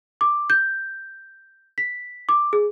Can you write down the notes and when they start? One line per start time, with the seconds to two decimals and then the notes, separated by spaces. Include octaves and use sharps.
0.21 D6
0.50 G6
1.78 B6
2.29 D6
2.53 G#4